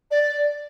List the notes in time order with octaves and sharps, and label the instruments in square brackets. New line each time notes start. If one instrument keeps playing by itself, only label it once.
[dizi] D5